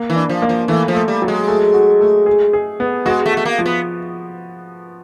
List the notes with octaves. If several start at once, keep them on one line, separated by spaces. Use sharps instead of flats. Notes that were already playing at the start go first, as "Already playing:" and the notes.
Already playing: A#3
E3
D4
F3
A#3
F3
E3 A3
F3
A3
G3
F#3
G#3
A3
F#4
A3
G#4
G#4
B3
G#3 F#4
A3
F#4
A3
A#3
F3
B3